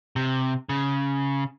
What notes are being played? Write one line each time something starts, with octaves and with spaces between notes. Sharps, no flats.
C3
C#3